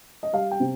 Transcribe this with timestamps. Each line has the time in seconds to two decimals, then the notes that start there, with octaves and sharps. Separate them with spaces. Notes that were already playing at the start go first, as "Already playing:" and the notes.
0.23 D#5
0.33 G3 F5
0.51 G5
0.60 C3